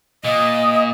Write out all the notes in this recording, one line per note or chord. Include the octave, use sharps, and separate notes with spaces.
A#2 D#5